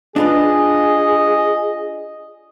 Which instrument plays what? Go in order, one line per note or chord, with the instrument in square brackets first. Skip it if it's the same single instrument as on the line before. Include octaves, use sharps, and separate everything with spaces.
[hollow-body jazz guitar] D4 F4 B4 [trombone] G#4 [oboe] D#5